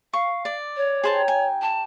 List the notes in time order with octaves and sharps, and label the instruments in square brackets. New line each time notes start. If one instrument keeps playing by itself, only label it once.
[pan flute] F5 [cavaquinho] C#6
[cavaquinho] D5
[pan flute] C#5
[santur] D#4 G4 G5 [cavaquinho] G#4 C5 A5
[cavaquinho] G#5
[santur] D5 [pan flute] A5